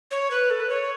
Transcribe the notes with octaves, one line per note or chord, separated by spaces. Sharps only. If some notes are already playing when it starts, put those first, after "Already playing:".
C#5
B4
A4
B4
C#5